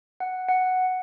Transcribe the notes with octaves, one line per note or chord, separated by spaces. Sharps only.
F#5
F#5